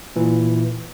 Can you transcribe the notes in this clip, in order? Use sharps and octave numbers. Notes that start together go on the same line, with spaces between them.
A#2 E3